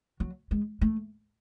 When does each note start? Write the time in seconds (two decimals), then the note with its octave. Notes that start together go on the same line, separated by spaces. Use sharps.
0.20 F#3
0.51 G#3
0.81 A3